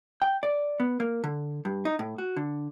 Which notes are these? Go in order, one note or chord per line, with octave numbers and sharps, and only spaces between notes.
G5
D5
B3
A#3
D3
G2
D#4
A2
F#4
D3